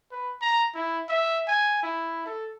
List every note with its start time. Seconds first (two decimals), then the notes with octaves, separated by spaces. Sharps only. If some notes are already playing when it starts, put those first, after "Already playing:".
0.12 B4
0.42 A#5
0.75 E4
1.09 E5
1.48 G#5
1.83 E4
2.26 A4